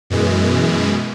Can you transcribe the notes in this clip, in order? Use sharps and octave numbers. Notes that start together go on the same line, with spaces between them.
F#2 B2 E3 G#3